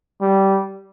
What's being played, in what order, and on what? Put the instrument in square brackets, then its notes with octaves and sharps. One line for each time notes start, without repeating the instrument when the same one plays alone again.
[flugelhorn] G3